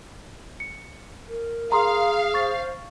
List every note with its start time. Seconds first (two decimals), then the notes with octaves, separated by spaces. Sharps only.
0.60 C#7
1.29 A#4
1.72 G#4 F5 A#5 C6 D#6
2.34 C5 C#6 A6